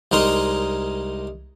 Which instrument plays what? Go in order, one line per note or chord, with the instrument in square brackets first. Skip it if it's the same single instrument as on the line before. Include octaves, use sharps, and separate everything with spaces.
[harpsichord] C2 G#3 D#4 A#4 A#5 C6